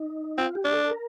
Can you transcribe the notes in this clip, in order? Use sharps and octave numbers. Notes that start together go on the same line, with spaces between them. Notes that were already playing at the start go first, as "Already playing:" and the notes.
Already playing: D#4
C4 F4
G4
D4
A4
A#4